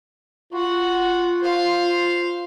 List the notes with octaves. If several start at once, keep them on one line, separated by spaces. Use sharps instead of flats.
F4 F#4 F#5
C5 F5